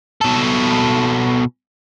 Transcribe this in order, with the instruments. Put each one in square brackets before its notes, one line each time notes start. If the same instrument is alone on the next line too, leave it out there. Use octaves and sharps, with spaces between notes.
[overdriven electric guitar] B2 A4